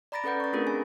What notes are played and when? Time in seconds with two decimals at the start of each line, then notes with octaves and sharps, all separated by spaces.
0.12 D5 A#5 B5 A6 A#6 D7
0.24 C#4 A4 B4 F#5 G6
0.40 C#6 A6
0.53 A3 C4 D4 F4 G#4 A#4
0.67 G#5